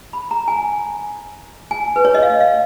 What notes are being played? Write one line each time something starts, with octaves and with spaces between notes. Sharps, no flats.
B5
A#5
G#5
G#5
B4
C#5
D#5
F5
F5